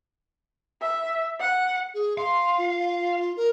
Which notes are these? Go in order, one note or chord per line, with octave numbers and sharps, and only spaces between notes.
E5
F#5
G#4
F5 C6
F4
A#4